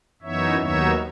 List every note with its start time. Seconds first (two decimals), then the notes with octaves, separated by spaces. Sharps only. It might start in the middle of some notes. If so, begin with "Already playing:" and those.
0.22 F#2 E3 B3 D#4 C#5 E5
0.59 D#2 D#3 F#3 B3 D#4 C#5 E5